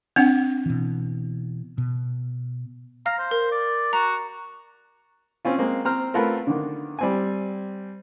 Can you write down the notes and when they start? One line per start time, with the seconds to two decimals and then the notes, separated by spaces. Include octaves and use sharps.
0.16 C4 D4 F#5
0.66 B2 E3
1.78 B2
3.06 F5 A#5 F6
3.19 C5
3.31 A#4
3.51 D5
3.93 F#4 A#5
5.45 C4 C#4 F4
5.58 G#3 A#3 C4
5.85 C4 C5 A#5 F6
6.14 A3 B3 C4 F4 A4 A#4
6.47 D3 D#3
6.99 G3 C4 G#5